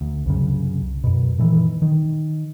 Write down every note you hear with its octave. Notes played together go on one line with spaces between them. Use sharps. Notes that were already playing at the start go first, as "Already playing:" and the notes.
D2
C2 F#2 C#3
F#2 B2
A#2 D#3 E3
D#3